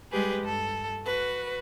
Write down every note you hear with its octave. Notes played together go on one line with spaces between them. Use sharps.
G3 G#3 G4 G#4 B4
G2 A4
F#4 B4